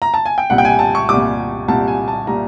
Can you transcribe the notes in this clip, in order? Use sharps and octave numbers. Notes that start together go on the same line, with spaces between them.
A#5
A5
G#5
G5
C2 A#2 G3 F#5
G5
G#5
A5
C#6
C2 A#2 G3 D6
C2 A#2 G3 A5
G#5
A5
A#2 G3 A#5